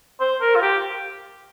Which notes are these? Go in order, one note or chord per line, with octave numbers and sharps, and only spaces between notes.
C5
A#4
F4
G4